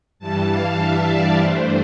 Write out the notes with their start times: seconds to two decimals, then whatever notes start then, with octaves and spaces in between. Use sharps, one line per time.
0.19 G2 E3 G3 A5
0.49 F5
0.79 E5
1.09 D5
1.39 G2 E3 A3 D4 C5